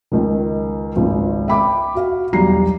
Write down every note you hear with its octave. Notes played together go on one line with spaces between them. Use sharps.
C#2 D#3
G#1 C#2
E5 G5 B5 D6
F#4 F5
E1 B1 G3 A#5 C7